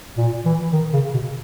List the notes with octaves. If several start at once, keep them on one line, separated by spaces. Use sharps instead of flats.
A#2
E3
D#3
C#3
B2